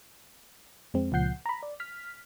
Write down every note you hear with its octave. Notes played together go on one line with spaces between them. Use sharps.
F2 G#3 C4
C#2 A#2 F3 F#5 G6 C7
A#5 B5
D5
F6 B6